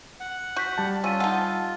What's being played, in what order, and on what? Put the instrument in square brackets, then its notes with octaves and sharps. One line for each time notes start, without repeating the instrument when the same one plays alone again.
[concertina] F#5
[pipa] F#4 [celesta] G6 B6
[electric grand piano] G3 A5
[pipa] C#4 [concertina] F4 [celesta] E6 D#7
[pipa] D#4 A4 [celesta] F#5